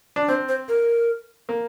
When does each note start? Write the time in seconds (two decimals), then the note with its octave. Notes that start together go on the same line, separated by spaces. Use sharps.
0.16 D4
0.28 C4 C5
0.49 C5
0.68 A#4
1.49 A#3